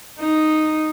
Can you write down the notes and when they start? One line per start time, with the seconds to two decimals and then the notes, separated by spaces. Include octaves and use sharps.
0.19 D#4